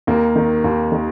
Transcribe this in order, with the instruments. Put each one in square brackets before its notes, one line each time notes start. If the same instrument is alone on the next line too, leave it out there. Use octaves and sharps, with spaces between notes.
[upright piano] D#2 A#3
D#3
D#2
D#3